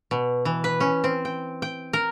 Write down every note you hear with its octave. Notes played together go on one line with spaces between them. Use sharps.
B2
E3
B4
C#4
C4
G5
G5
A#4